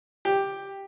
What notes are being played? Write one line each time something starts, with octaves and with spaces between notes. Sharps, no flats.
G4